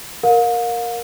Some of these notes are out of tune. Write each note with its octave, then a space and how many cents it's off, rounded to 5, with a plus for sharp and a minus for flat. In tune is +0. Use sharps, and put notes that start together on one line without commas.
A#4 +0 F5 +35